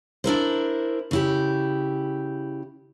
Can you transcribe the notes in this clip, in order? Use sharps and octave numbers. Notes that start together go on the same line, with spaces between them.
D4 E4 A#4 C5
C#3 E4 G4